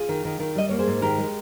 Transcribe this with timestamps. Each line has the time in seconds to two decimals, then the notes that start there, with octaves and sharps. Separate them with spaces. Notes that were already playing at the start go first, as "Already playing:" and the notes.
Already playing: F4 G#4
0.09 D#3
0.25 D#3
0.40 D#3
0.55 G3 D#5
0.69 A#3 C#5
0.79 G#4 C5
0.87 G#2
1.02 D#3 G4 A#4
1.18 G#3